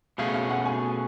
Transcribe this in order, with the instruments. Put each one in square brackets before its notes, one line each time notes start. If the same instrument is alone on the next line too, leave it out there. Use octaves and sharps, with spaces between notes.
[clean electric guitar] B2 A3 C#4 G#4 [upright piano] F5
[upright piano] F5
F#5
G#5